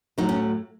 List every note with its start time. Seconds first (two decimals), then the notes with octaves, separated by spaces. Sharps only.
0.18 A2 F#3 A3 D#4
0.29 C#4